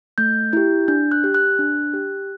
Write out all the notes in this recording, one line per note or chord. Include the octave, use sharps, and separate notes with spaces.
A3 G6
E4 G4 G6
D4 G6
F#6
G4
F#6
D4
G4